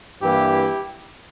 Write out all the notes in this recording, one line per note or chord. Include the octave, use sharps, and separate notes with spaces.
G2 E3 A#3 E4 G4